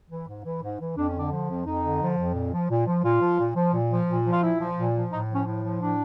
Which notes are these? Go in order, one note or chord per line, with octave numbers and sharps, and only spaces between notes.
E3
G#2
E3
G#2
E3
F2 D4
C#4
D3 D4
F3
F2
F2 D#4
D3
F3
F2
A#2
F3
A#2
F3
A#2 F4
F3
A#2
F3
A#2
F3
A#2
F3
F4
A#2 E4
F3
A#2
F3
A2 D#4
F3
C#4
A2
F3
A2 D4